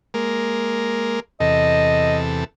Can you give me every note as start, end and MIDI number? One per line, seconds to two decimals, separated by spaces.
0.14 1.20 56
0.14 1.20 58
0.14 1.20 70
1.40 2.44 40
1.40 2.44 48
1.40 2.44 69
1.40 2.17 75